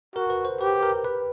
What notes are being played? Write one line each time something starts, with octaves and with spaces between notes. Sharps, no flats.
F#4 A#4
B4
C5
G4 B4
A#4
B4